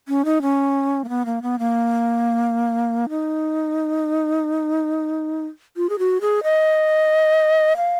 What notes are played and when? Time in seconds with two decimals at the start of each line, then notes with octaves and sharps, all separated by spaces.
0.08 C#4
0.25 D#4
0.42 C#4
1.04 A#3
1.09 B3
1.25 A#3
1.42 B3
1.59 A#3
3.09 D#4
5.77 F4
5.90 G#4
5.99 F#4
6.21 G#4
6.43 D#5
7.77 F5